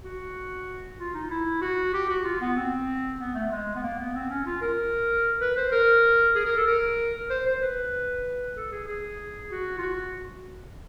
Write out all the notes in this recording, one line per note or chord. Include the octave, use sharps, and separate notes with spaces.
F#4
F4
D#4
E4
F#4
G4
F#4
F4
B3
C4
B3
A3
G#3
B3
A#3
B3
C4
C#4
F4
A#4
B4
C5
A#4
G#4
A#4
A4
A#4
C5
C5
B4
A4
G#4
G#4
F#4
F4
F#4